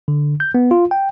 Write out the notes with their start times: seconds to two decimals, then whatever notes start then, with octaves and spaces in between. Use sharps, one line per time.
0.08 D3
0.40 G6
0.55 B3
0.71 F4
0.91 G5